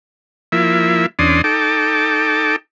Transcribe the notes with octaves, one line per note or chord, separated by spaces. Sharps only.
F3 A#3 E4 E5
E2 C#4 D4 D5 C6 D#6
D#4 A4 G5 A5 D6